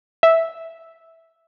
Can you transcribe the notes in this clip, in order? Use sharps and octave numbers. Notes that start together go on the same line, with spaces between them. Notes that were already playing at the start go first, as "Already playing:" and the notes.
E5